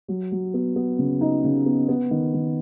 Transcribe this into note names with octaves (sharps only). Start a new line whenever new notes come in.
F#3
F#3
B3
B3
C#3
D#4
C#3
B3
B3
D#3
D#3